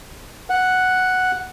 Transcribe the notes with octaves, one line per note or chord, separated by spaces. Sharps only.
F#5